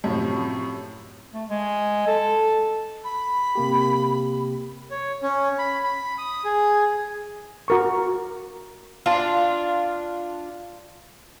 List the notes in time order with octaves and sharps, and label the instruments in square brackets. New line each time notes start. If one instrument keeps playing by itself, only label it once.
[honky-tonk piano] F#2 A2 C3 F3
[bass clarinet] A3
G#3
A4
[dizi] B5
[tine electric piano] C3 A#3 G4
[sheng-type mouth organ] C#5
C#4
B5
B5
D#6
G#4
[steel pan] F#4 A#4 C#6
[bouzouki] D4 F4